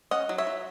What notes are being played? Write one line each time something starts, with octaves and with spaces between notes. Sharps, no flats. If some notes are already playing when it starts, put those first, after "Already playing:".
C#4 D#5 F#5
F#3
C#5 E5
F#3